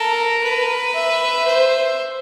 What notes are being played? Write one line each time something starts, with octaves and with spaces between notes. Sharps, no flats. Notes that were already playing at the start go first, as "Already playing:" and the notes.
Already playing: A4 A#4
B4
E5
C5